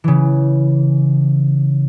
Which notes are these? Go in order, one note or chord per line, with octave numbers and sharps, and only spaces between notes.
C#3 E3